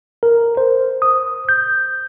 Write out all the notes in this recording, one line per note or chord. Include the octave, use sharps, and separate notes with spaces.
A#4
C5
D#6
G6